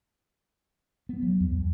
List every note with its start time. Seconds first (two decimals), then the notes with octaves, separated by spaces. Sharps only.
1.09 B3
1.23 F#3
1.40 E2
1.55 E2